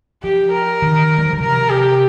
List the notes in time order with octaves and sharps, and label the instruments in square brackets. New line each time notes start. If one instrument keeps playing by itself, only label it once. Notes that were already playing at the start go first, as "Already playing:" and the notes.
[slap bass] F3 [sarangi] G4
[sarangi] A#4
[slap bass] D#3
G3
F3
D#3
[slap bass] C3 [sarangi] A#4
[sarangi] G4